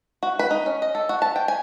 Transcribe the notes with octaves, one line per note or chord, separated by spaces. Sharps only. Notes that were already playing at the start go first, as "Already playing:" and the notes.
F#4
B4
D#4
C#4
D#5
A4
F#4
A5
G5
G#5